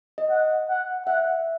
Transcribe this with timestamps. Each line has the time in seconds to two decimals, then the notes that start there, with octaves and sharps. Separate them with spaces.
0.18 D#5
0.30 F#5
0.69 F#5
1.06 E5 F#5